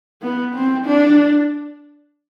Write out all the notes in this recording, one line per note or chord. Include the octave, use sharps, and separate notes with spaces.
B3
C4
D4